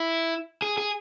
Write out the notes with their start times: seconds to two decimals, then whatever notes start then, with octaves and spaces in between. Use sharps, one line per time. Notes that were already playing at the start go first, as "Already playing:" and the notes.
Already playing: E4
0.62 G#4
0.78 G#4